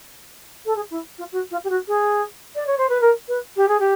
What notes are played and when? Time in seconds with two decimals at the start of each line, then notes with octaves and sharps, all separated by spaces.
0.65 A4
0.76 G#4
0.90 E4
1.18 F4
1.32 F#4
1.51 F4
1.64 G4
1.69 F#4
1.88 G#4
2.55 D5
2.66 C#5
2.78 C5
2.89 B4
3.01 A#4
3.28 B4
3.56 G4
3.68 G#4
3.79 G4